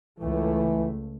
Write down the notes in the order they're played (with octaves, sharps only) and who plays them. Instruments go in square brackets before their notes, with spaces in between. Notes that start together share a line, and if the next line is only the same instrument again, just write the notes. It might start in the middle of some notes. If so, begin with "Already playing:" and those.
[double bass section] C#2 A3 [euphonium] E3